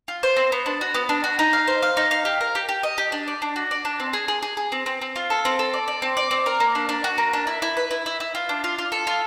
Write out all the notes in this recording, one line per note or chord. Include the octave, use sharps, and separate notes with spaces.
F4
C5
C4
B3
D4
F#4
B3
D4
F#4
D#4
F5
C5
F5
D#4
F5
G4
A#4
G4
G4
D#5
G4
D4
D5
D4
F#4
D5
D4
C4
G#4
G#4
G#4
G#4
C4
C4
C4
F4
A4
C4
A4
D5
D5
C4
D5
C4
A#4
A#3
D4
D4
F#4
A#3
D4
E4
E4
B4
E4
E4
E4
F4
D4
F4
F4
A4
F4